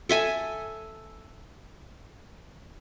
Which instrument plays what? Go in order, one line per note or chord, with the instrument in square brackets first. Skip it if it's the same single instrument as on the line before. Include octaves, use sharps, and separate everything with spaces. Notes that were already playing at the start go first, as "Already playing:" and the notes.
[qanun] A4 E5 G#5